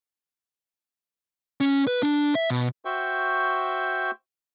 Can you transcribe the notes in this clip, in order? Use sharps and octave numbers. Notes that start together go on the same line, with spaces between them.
C#4
B4
D4
E5
B2
F#4 C5 E5 G5 C#6